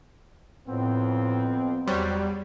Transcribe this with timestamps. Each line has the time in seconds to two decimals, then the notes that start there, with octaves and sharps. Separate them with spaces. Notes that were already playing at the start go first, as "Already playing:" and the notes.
0.67 F2 A2 B3 C4
1.87 E2 F#3 G3 C5